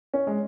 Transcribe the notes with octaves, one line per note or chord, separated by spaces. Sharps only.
C#4
G#3